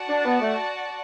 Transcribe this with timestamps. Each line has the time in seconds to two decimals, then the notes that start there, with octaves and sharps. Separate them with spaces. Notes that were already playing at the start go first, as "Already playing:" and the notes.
Already playing: F#4 D5 F#5 A5
0.09 D4
0.25 B3
0.41 A3